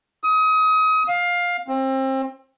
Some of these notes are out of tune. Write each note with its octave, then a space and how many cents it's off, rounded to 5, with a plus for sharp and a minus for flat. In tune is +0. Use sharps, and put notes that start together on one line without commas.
D#6 +30
F5 +15
C4 +30